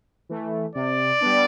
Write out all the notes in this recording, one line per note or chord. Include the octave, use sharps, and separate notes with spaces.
E3 A3
C3 D5
G3 B3 D4